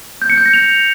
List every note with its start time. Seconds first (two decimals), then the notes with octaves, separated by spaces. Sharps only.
0.22 G6
0.30 C#7
0.38 G6
0.46 A#6
0.54 F7